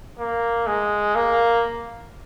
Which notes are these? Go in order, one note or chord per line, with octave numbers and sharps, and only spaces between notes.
A#3
G#3
A#3